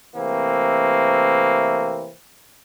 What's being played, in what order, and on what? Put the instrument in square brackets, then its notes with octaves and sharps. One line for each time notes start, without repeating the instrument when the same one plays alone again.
[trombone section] C3 E3 A3 A#3 C4